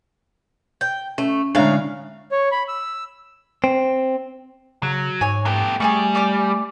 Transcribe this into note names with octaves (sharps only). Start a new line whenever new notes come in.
G5 G6
A3 C#4
A2 D3 G#3 D4 E5 F5 A#5
C#5
B5
E6
C4
C#3 F#3
G#2 C#5 G#5
A3 B3 G4
G3 A3 G#4 G#5 A5 C#6
D5 D6 F6